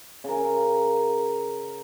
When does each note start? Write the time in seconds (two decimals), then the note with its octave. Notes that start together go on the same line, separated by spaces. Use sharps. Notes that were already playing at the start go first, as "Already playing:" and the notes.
0.24 C#3 A#4